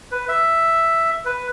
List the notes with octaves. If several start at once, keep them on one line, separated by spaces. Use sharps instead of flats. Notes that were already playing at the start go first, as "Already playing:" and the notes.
B4
E5
B4